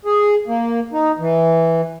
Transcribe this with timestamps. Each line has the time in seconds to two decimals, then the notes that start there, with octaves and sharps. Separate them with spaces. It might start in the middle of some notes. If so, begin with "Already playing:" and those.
0.05 G#4
0.47 A#3
0.92 D#4
1.19 E3